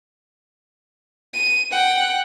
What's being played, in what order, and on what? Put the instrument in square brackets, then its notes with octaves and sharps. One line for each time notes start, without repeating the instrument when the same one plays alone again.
[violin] D#7
F#5 G5